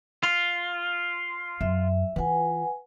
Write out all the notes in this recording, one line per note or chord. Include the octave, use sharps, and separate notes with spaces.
F4
F#2 E5
E3 F4 B4 F#5 G#5